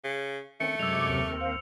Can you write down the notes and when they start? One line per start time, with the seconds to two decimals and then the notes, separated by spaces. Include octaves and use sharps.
0.04 C#3
0.60 D#3 A3 C4 C#4 C#7
0.79 F#2 C3 G#3 D6 E6 G#6 F7
1.09 D#2 C4 A#4
1.36 C5 F5